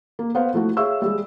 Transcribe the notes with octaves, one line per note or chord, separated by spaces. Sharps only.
A#3
B3 C5 F5
F3 A3 E4 F#4
G#4 C#5 E5 F5 C#6 E6
G3 G#3